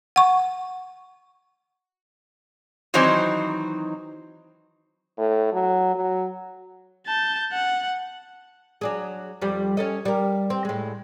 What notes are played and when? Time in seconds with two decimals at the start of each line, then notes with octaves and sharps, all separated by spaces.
0.16 F#5 C#6
2.94 D#3 E3 F#3 C4 D#4 C5
5.18 A2
5.53 F#3
5.95 F#3
7.07 A5 G6
7.52 F#5
8.81 F#3 D4 G#4
9.41 F2 G3
9.77 C#4 A4 D#5
10.05 G3 A#4
10.50 C4
10.65 A2 G#3